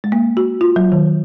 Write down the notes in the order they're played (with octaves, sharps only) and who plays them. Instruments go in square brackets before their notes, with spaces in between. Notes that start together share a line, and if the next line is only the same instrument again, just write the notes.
[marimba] G#3
A#3
F#4
F4
F#3
D#3